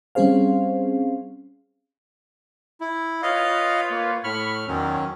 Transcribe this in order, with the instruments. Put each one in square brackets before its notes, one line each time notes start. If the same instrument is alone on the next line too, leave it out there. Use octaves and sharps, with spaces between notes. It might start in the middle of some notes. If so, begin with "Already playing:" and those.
[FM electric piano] G3 C4 C#4 G#4 C5 F5
[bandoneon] E4
[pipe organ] F4 B4 C#5 [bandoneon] D#5 F5
[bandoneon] A#3
[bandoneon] A2 F6 [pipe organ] B5 C#6
[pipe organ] E2 [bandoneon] D#3 F#3 C#4